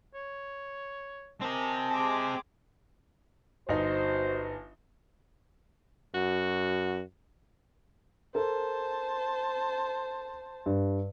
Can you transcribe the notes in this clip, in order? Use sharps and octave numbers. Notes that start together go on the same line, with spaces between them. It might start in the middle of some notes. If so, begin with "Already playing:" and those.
C#5
C4 G4 A#4 D#5 G#5 A5
G#3 D6
G1 D#4 F#4 C5
F#2 F#4
A4 A#4 C5 A5
G2